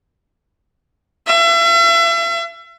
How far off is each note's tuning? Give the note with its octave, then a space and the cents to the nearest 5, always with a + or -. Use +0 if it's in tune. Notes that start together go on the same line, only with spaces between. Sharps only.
E5 +40